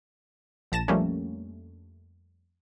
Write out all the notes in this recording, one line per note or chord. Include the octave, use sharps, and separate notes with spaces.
A#1 A5 A#6 E7
F2 G3 A3 A#3 C#4